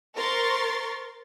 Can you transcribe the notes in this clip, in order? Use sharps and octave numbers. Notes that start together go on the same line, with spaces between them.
A#4 C5 C6 C#6 A6